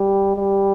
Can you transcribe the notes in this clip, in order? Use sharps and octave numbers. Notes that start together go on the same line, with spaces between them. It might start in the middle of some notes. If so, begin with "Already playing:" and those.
Already playing: G3
G3